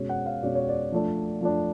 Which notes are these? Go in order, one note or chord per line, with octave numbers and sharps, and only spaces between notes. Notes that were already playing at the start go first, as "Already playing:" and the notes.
Already playing: B2 G#3 C#4
F#5
F5
B2 G#3 C#4 D5
C#5
D5
F3 A3 D4
F3 A3 D4